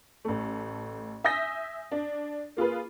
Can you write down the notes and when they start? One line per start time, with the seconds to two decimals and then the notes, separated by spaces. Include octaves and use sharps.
0.25 A1 A3
1.24 E5 G#5 D#6 G6 A#6 B6
1.91 D4
2.57 A#3 F4 G#4 B4